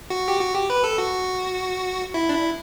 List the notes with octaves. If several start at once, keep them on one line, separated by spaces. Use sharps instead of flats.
F#4
G4
F#4
G4
B4
A4
F#4
E4
D4
E4